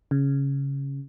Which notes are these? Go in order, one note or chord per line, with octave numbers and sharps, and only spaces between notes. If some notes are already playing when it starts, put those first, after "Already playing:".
C#3